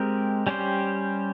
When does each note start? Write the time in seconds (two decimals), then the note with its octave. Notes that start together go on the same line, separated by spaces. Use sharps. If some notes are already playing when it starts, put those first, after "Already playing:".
Already playing: G#3 C4 G4 A#4
0.47 G3 C#4 G4 C5